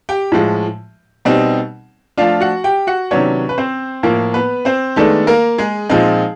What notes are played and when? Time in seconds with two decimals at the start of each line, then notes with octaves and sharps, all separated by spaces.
0.09 G4 G5
0.32 A2 F3 G#3
1.25 B2 G3 C4 D#4
2.17 F3 A3 D4 F4 F5
2.40 F#4 F#5
2.64 G4 G5
2.87 F#4 F#5
3.11 C3 D#3 F#3 B3 C#4 D4 C#5
3.49 B4
3.58 C4 C5
4.03 A2 F3 A#3 A#4
4.34 B3 B4
4.65 C4 C5
4.96 D#3 G#3 A3 B3 D4 A4
5.27 A#3 A#4
5.58 G#3 G#4
5.89 A#2 F3 G#3 C4 D#4